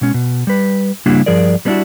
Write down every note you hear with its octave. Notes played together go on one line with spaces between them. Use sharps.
B2 G#3 C#4
B2
G3 B4
C#3 G3 A#3 D4 E4 F#4
G2 F3 G#4 A#4 D5
G3 B3 C#4 D4 E4 F#4